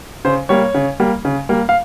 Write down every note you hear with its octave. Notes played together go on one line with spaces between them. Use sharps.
C#3 C5
G3 A#3 C#5
C#3
G3 A#3
C#3
G3 A#3
F5